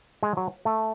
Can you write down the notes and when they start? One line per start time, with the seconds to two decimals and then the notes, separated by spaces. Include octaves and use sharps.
0.23 G#3
0.37 F#3
0.65 A3